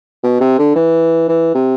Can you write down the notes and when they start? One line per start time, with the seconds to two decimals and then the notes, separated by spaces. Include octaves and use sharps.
0.24 B2
0.41 C3
0.59 D3
0.76 E3
1.28 E3
1.55 C3